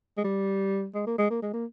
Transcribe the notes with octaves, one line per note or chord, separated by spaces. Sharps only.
G#3
G3
G#3
A#3
G#3
A#3
G#3
A#3